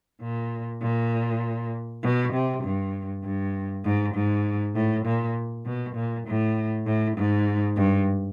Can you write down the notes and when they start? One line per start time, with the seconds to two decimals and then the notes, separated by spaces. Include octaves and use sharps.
0.21 A#2
0.81 A#2
2.03 B2
2.33 C3
2.64 G2
3.23 G2
3.84 G#2
4.15 G#2
4.74 A2
5.05 A#2
5.65 B2
5.95 A#2
6.26 A2
6.85 A2
7.17 G#2
7.76 G2